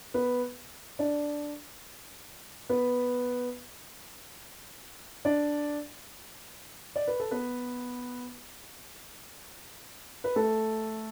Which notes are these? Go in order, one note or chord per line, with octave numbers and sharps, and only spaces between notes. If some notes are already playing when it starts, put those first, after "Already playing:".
B3 B4
D4 D5
B3 B4
D4 D5
D5
B4
A4
B3 B4
B4
A3 A4